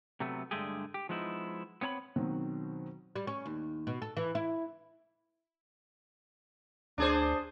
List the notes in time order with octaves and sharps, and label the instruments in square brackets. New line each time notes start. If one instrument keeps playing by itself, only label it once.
[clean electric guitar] C3 F#3 A3 B3
G2 D3 G#3 A3 G4 G#4
G4
F3 G#3 B3 D#4 E4
B3 C4 C#5 A#5 B5
[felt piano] B2 D#3 F#3 C4 F#4
[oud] G3
C#4
D#2
B2
A4
E3
E4
[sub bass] D2 [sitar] D4 G#4 C5